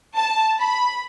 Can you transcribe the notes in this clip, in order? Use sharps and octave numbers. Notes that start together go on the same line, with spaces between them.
A5
B5